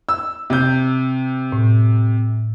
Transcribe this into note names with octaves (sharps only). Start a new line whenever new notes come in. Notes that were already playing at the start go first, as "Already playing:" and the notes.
E6
C3 G6
A2